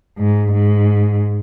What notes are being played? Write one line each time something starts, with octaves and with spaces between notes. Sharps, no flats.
G#2
G#2